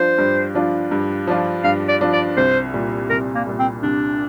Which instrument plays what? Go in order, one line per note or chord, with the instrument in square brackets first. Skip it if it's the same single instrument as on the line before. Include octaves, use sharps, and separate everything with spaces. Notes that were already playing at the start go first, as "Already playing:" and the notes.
Already playing: [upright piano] G2 F3 D4 F4 [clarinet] C5
[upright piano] G2
F3 D4 F4
G2
F3 D4 F4
[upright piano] G2 [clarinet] F5
[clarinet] D5
[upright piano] F3 D4 F4
[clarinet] D5
[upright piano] C2 [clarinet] C5
[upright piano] A#2 G3
[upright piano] C2 [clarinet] A#4
[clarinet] A#3
[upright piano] A#2 G3
[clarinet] C4
[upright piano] C2 [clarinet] D4